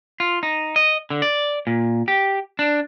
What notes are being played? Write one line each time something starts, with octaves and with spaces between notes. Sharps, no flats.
F4
D#4
D#5
D3
D5
A#2
G4
D4